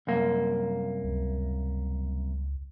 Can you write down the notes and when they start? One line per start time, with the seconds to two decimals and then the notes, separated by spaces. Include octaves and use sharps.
0.07 C2 F#2 A#3
1.04 C#2